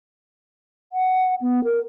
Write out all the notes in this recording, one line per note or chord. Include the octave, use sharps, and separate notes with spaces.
F#5
B3
A#4